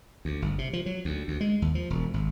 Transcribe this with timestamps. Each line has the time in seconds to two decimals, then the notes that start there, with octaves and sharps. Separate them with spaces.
0.25 D2
0.42 G1
0.58 C3
0.73 F3
0.86 F#3
1.05 D2
1.28 D2
1.41 G#3
1.62 D#2
1.75 F3
1.90 E1
2.14 G#1